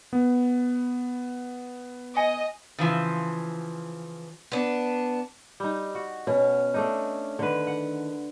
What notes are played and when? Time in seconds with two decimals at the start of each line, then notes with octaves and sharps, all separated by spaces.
0.13 B3
2.17 D#5 G#5
2.78 C#3 E3 F3
4.52 B3 D4
5.60 G3 D#4
5.95 F#4
6.27 B2 C#4
6.74 A3 D4 D#4
7.39 D3 D#3 B4
7.67 F#5